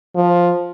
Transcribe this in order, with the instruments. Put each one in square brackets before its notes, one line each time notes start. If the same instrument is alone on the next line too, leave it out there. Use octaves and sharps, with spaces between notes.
[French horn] F3